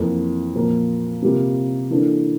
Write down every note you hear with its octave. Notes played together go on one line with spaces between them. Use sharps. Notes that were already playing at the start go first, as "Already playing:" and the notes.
Already playing: F2 E3 A#3
A#2 F3 A#3
C3 G3 A#3 F4
E3 A#3 D4 A4